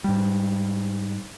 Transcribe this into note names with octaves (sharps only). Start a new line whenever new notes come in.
G#2 G3